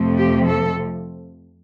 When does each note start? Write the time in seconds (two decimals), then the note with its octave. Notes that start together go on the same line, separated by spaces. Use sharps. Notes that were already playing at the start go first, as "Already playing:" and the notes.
Already playing: F2 C3 F3 A3
0.17 G4
0.47 A4